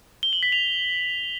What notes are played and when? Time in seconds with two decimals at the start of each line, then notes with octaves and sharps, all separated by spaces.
0.23 G7
0.33 F#7
0.43 B6
0.52 F7